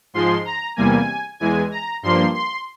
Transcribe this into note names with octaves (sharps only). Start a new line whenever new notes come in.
G#2 F3 G#3 C6
A#5
E2 C3 G3 A#3 G#5
E2 E3 G#3 G#5
A#5
G2 F3 A#3 C6
C6